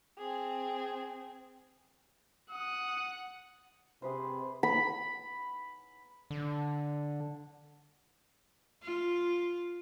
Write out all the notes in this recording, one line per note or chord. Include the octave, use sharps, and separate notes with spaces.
C4 G#4
F#5 D#6
C3 G#4 B4 C5
B5
D3
F4